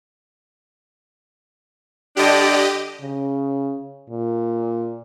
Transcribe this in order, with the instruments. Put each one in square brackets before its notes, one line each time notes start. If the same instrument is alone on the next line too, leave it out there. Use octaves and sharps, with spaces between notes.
[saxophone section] D3 G3 D4 [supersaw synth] G4 D#5
[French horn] C#3
A#2